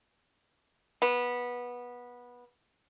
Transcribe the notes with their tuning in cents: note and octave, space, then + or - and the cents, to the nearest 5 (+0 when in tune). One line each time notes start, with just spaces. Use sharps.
B3 -15